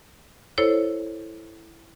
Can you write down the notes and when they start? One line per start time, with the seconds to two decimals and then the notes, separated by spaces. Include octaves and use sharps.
0.58 E4 A4 C5 C#5